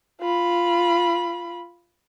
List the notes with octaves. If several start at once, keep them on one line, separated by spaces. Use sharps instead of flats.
F4 B5